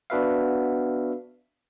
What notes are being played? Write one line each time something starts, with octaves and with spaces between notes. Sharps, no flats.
B3 D4 F#4 B4 E5 F5